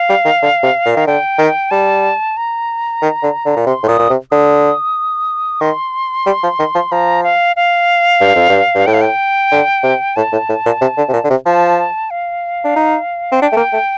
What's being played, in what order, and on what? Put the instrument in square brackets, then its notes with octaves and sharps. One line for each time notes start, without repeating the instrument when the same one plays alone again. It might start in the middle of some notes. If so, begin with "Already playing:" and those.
Already playing: [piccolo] F5
[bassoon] G3
D#3
D3
C3
A#2
D#3
[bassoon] D3 [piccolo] G5
[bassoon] D#3
[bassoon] G3 [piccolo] A5
[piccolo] A#5
[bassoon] D#3
D3
D3
A#2
[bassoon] C3 [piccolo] C6
[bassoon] A2
[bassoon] A#2 [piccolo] D#6
[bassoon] A#2
C3
[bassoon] D3 [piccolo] D#6
[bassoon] D#3 [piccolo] C6
[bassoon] G3
F3
D#3
F3
[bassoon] F3 [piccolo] A#5
[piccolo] F5
F5
[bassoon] G2
F2
G2
G2
[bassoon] A2 [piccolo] G5
[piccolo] F5
G5
[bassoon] D3
C3
[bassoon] A2 [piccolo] A5
[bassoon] A2
A2
A#2
C3
D3
C3
A#2
D3
C3
[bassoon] F3 [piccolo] A5
[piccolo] F5
[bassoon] D4
D#4
C4
[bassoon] D4 [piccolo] G5
[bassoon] A3
A#3
A3